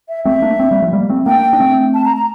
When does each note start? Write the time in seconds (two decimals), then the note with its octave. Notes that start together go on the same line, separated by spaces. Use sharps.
0.09 E5
0.25 A3 C4 E5
0.42 A#3 D4
0.59 A3 C4
0.71 G3 A#3
0.82 F3 A3
0.93 G3 A#3
1.09 A3 C4
1.26 A#3 D4 G5
1.53 D4
1.60 A3 C4
1.94 A5
2.05 A#5
2.16 A#5